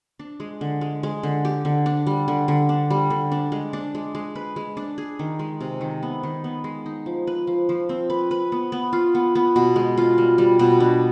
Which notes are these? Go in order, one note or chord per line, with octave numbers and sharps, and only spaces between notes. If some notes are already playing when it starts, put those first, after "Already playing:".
D4
G#3
D3
G#3
G#3
D3
G4
D3
D4
G3
D3
D3
D4
G3
D3
D4
G#3
D4
G#3
G#3
B4
G#3
D4
G#4
D#3
G#3
C3
D#3
B3
D#3
B3
G#3
D#4
F3
B4
F3
F3
C4
B4
B4
B3
B3
F4
B3
B3
B2
G#3
F4
G3
G3
B2
D4